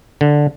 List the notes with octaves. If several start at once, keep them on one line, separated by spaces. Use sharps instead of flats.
D3